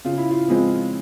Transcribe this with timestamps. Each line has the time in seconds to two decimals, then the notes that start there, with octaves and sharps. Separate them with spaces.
0.05 C#3 F4
0.17 E4
0.31 F4
0.48 F3 G#3 C4 E4